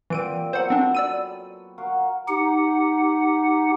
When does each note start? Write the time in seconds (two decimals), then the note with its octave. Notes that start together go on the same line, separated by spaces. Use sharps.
0.10 A#2 E3 C4 G4 D7 D#7
0.53 F#3 B3 A4 C5 F#5
0.70 C4 D4
0.95 D5 E6 D#7
1.78 F#4 A#4 F5
2.28 D#4 G4 F#5